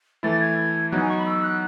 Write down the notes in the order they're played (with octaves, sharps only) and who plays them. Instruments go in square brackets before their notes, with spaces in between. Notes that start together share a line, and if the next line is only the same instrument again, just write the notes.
[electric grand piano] E3 A3 E4 [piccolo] A6
[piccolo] G#6
[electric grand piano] F#3 B3 D#4 [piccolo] F#6
[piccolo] G#5
C#6
B5
E6
F#6